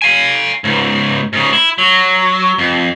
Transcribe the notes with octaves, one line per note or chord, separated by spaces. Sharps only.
F5 G#5
C#2 G#2
G#2 C#3
E4
F#3
F2